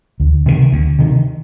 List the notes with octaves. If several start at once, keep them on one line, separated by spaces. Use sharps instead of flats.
D2
C3 D#3
D2
C3 D#3